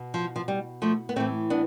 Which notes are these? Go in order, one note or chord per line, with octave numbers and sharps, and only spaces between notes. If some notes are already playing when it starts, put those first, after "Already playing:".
Already playing: B2
F3
F3
G3
F3 A3
B3
A2 E3 A3 C4
B3 D4